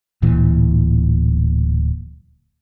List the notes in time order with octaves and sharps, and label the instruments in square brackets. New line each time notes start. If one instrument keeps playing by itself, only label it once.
[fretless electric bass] D1 A#2 E3